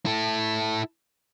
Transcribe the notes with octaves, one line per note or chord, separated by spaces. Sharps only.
E4 A4